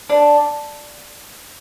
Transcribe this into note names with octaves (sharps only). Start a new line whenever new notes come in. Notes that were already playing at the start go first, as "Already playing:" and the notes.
D4